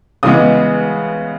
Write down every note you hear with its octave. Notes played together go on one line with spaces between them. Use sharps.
C#3 E3 G#3 B3 D#6